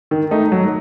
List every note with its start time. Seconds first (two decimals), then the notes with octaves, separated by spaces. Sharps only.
0.11 D#3
0.31 A3 D#4
0.52 F#3